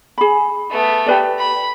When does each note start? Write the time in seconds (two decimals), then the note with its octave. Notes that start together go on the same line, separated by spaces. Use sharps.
0.18 G#4 B5
0.71 A3 B3
1.06 G4 B4 D5
1.39 B5